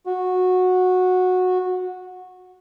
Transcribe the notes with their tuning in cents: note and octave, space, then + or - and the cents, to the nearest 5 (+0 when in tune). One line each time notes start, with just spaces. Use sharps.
F#4 -15